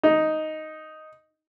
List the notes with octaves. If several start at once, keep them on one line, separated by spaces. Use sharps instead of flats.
D#4